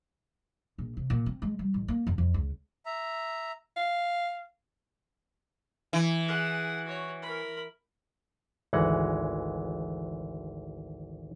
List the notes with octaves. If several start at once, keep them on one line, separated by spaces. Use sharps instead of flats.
A#1
C3
A#2
C4
G#3
G3
A1
A#3
F#2
F2
C#2
E5 A#5
F5
E3
G#4 F#5
F#4 C#5
A#4 B5
G#1 D2 E3 G#3 F#5